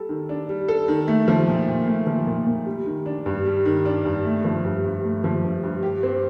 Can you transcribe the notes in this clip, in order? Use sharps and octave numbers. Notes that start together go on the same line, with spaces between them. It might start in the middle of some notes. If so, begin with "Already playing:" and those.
Already playing: G3 A4
D#3
D4
G3
A4
D#3
A3
F3
A#2
A#2
A3
F3
A#2
A#2
G3
D#3
D4
G2
G3
D#3
D4
G2
A3
F3
G2
G2
A3
F3
G2
G2
G4
C4